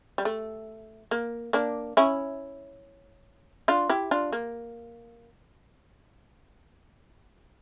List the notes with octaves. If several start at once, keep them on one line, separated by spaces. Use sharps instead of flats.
G3
A3
A#3
A#3 D4
C#4 E4
D4 F4
E4 G4
D4 F4
A#3